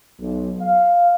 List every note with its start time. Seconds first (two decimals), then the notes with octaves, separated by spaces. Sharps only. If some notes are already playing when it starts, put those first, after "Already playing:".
0.21 B1
0.61 F5